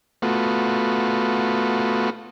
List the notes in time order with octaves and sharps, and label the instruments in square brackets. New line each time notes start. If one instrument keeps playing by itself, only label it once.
[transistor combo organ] A3 B3 F4 F#4